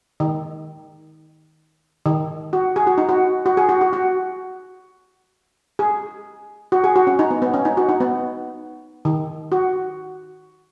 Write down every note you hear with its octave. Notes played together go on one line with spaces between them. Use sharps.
D#3
D#3
F#4
G#4
F#4
D#4
F#4
F#4
G#4
F#4
F#4
F#4
G#4
F#4
G#4
F#4
C#4
D#4
B3
B3
C#4
D#4
F#4
D#4
B3
D#3
F#4